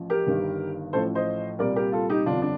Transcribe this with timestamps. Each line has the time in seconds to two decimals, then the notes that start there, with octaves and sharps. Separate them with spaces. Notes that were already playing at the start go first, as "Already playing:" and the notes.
Already playing: A1 F3
0.10 G4 A#4
0.26 G1 G2 D#3 G3
0.93 A1 A2 F3 A4 C5
1.15 C5 D#5
1.59 C2 A#2 G3 A#4 D5
1.76 G4 A#4
1.92 F4 A4
2.10 D#4 G4
2.26 G1 F2 D3 D4 F4
2.42 D4